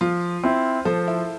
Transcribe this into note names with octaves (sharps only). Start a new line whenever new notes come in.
F3 F4
C4 E4
F3 A4 C5
E4